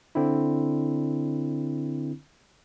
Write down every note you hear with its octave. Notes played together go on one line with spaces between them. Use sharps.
D3 C4 D4 E4